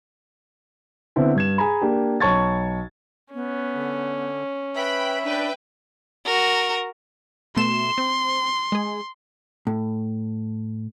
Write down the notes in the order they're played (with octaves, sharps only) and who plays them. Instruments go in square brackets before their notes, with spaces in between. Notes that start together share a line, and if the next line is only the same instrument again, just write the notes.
[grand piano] D3 B3 C4 E4
G2 G#6 E7
G#4 G#5 A#5 B5
A#3 D4 G4
B1 C#5 A5 C#6 G#6 A6
[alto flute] B3 [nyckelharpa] C#4
[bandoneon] D3
[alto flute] B4 [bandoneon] E5 [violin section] G5 B5
[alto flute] D4 [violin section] B4 G5
[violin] F#4 A#4
[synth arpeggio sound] B2 A3 E7 [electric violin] C6
[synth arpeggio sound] C4
G#3 G#4
[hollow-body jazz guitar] A2